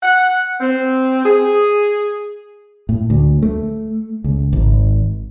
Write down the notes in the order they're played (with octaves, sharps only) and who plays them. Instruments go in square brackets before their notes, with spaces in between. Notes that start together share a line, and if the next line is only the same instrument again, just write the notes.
[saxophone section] F#5
C4
G#4
[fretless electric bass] A2
D2
A3
C#2
G#1